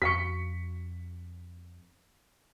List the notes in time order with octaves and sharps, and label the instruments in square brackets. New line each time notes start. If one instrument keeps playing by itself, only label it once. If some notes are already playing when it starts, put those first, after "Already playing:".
[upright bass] F2 [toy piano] F#4 F5 C#6 [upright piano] B6 C#7